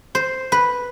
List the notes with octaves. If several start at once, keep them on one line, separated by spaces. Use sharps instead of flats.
C5
B4